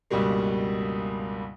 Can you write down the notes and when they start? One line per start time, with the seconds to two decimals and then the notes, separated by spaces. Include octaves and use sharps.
0.10 C#2 G2 B2 G3 A#3